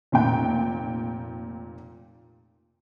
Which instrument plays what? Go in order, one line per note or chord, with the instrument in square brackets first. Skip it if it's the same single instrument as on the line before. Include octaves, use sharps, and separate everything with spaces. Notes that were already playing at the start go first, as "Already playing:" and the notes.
[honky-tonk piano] F1 A#2 G5